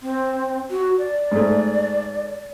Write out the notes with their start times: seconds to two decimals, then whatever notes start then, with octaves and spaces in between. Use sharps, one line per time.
0.02 C4
0.70 F#4
0.98 D5
1.31 G#2 A3